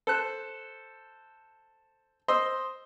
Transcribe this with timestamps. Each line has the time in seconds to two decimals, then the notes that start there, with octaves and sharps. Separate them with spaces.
0.07 A4 C5 F#6
2.28 C5 D#5 C6 E6